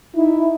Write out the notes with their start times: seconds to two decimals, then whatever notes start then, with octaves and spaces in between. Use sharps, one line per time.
0.16 D#4 E4